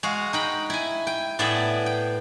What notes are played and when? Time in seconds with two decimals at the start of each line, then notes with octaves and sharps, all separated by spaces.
0.03 G#3 F#4 F5
0.33 D#4 G5 B5
0.70 E4 G#5
1.07 G5
1.39 A2 B3 G#4 D5 E5
1.86 G5